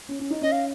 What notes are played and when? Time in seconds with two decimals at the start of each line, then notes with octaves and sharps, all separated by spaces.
0.09 C#4
0.19 C#4
0.30 D#4
0.41 C#4 D#5
0.52 F5